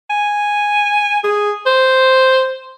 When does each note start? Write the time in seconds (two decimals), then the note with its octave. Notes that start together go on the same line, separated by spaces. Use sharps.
0.10 G#5
1.24 G#4
1.66 C5